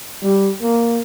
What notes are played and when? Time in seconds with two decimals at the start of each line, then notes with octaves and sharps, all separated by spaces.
0.22 G3
0.61 A#3